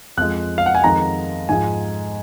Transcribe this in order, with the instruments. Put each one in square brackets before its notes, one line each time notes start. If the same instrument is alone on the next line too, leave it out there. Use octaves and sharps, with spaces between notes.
[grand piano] F2 F3 G#3 F#6
F5
F#5
G#5
F2 D#3 G#3 A#5
G#2 F3 G#3 G#5